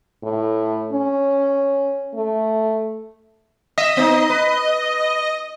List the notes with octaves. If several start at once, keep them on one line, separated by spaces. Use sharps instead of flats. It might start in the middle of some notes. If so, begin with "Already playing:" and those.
A2
C#4
A3
D#5 E5
B3 D#4
B4